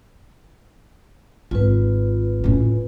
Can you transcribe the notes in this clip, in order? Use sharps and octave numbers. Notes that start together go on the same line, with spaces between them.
G#1 F4 B4
A2 C#4